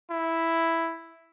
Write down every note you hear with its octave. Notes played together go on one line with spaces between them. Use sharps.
E4